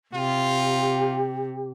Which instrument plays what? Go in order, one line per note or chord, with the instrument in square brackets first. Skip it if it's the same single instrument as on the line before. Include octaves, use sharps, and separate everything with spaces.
[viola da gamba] C3 [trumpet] F4 [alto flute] G4